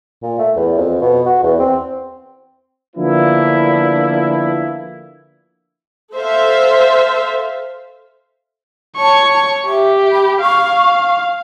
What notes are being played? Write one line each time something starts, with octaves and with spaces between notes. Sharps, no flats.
A#2
A3
E2
F2
B2
F#4
E2
C4
D3 F3 A#3 B3 D4 E4
A4 C5 E5 F5
C#5 A5 C#6
G4 E5
B5
F5 C#6